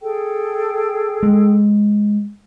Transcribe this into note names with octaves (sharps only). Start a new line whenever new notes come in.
G#4 A4 G5
G#3